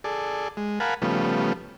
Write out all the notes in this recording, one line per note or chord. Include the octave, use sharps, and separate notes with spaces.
G#4 A4 D5
G#3
A#4 F5 F#5 G#5 A5 B5
C#3 F3 G3 A3 B3